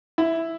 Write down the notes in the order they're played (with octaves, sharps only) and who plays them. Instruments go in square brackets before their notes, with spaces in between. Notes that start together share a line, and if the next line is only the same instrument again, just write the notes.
[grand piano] E4